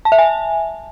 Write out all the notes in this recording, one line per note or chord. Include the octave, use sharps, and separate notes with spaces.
A5
E5
G#5